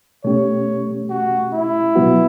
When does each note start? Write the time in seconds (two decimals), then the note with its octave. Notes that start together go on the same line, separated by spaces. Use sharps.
0.24 B2 A3 C#4 G4 C#5
1.10 F#4
1.53 E4
1.95 B2 F#3 B3 F#4